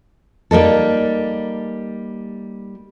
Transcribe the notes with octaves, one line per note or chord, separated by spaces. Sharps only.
G3 A#3 D#4 A4